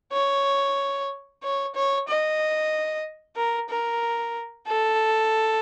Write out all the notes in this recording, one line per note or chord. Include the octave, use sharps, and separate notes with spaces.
C#5
C#5
C#5
D#5
A#4
A#4
A4